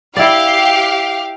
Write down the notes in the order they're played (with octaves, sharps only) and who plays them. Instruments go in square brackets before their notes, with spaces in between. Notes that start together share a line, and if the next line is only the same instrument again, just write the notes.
[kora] E4 D5 [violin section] G4 F5